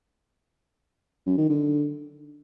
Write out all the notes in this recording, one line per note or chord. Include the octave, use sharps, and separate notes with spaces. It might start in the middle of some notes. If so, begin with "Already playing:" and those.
F#2
D#3
D3